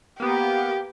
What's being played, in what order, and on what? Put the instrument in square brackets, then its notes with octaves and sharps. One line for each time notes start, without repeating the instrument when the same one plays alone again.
[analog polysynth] A#3 B3 [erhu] G4